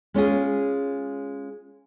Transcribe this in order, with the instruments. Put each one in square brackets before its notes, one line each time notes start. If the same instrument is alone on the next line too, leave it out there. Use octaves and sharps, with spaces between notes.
[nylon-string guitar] G#3 C#4 F4 G#4